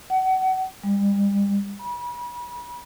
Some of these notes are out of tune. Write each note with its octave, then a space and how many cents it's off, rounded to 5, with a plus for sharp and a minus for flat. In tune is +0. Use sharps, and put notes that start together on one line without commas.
F#5 +30
G3 +35
B5 -35